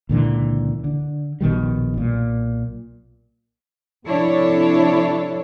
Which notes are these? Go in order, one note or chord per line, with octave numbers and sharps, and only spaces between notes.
C#2 A#2 D3 E3
D3
A#1 B2 D#3 G3
B1 A#2
C3 F3 D4 E4 A4 C#5